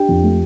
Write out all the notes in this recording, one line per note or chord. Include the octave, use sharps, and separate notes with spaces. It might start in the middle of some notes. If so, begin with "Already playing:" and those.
Already playing: D4 G4 G5
F2
A3